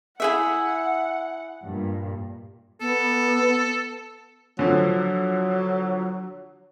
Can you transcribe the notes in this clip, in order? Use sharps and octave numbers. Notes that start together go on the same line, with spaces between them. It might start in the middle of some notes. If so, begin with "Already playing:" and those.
E4 G#4 E5 F#5
G2 A#2
B3 A4
D3 F3 F#3